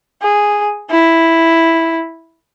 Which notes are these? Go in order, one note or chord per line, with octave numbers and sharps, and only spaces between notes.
G#4
E4